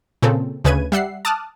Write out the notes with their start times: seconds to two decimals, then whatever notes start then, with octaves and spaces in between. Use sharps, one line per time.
0.22 A#2 C#3 C4 A4
0.64 D2 C#3 B4 G#6 D#7
0.92 G3 E5 F#5 C7
1.25 A5 D6 D#6 F6 F#6